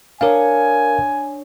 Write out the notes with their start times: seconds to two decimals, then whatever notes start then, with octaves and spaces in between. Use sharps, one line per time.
0.21 D4 A#4 C#5 F5 G#5 D#6